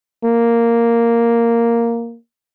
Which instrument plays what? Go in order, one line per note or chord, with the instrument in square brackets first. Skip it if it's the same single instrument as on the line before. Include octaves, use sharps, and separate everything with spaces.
[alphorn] A#3